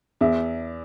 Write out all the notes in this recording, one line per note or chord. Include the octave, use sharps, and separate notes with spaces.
E2 E5